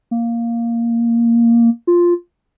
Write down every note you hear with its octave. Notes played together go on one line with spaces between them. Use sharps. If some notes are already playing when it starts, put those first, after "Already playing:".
A#3
F4